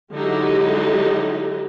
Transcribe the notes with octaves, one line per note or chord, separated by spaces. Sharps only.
D3 F#3 G#3 D#4 E4 G4